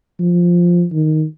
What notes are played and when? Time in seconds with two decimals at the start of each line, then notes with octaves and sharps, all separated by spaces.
0.20 F3
0.92 D#3